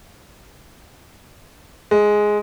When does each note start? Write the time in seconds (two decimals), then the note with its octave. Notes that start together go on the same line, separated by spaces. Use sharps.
1.91 G#3